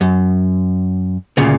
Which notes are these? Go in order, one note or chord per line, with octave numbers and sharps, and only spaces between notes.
F#2
D2 A#2 C#3